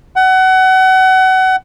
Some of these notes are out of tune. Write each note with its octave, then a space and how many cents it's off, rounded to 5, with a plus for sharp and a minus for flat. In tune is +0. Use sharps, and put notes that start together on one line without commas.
F#5 +25